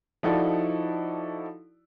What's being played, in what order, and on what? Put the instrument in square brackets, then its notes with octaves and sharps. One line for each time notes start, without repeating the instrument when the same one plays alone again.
[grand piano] F3 D#4 E4 F#4 A4 D5